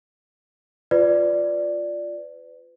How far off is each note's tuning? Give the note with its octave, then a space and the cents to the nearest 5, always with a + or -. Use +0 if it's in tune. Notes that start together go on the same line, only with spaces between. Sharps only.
F4 +0 B4 +35 D5 +0